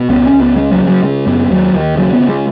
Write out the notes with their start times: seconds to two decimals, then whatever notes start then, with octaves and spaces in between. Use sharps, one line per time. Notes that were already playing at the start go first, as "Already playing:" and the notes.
Already playing: B2
0.09 C#2 B3
0.25 C#4
0.33 C#2
0.41 B3
0.56 C#3 G#3
0.72 F#3
0.80 C#3
0.88 F#3
1.03 C#3 G#3
1.27 F#2 B3
1.50 D#2 F#3
1.73 D#2 D#3
1.97 C#3 F#3
2.13 B3
2.21 C#3
2.29 G#3